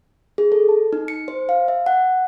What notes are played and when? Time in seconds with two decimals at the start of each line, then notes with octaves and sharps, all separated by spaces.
0.38 G#4
0.52 A4
0.69 A5
0.93 D#4
1.08 C#7
1.28 C5
1.49 F5
1.68 E5
1.86 F#5